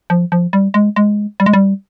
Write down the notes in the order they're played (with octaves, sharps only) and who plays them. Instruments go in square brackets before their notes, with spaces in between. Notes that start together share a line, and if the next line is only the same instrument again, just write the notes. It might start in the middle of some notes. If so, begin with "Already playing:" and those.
[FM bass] F3
F3
G3
G#3
G#3
G3
G#3
G3